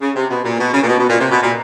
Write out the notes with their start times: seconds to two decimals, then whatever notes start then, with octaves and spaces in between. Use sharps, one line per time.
0.02 C#3
0.16 C3
0.30 B2
0.45 A#2
0.59 B2
0.73 C#3
0.83 A#2
0.88 B2
0.99 B2
1.09 A#2
1.20 C3
1.31 B2
1.42 A#2